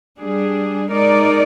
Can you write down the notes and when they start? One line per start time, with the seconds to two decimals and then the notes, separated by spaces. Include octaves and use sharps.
0.19 G3 D4 G#4
0.90 G#3 D#4 A#4 D5